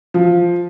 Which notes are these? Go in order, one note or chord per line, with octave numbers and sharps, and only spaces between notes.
F3